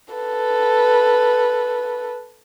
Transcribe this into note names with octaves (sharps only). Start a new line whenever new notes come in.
A4 B4